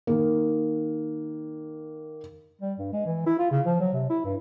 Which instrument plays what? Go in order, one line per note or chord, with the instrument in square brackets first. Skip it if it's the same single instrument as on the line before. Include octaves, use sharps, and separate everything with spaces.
[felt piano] D#3 A#3
[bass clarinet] G3
G2
G#3
E3
E4
F4
C#3
F3
F#3
C3
E4
G2